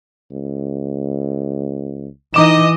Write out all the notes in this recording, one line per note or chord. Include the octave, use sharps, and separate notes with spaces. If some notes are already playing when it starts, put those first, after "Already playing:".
C#2
E3 D#4 D#5 D6 E7